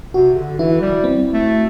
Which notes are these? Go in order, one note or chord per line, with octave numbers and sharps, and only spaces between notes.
C3 F#4
D3
E3 E4
G3
C4
A3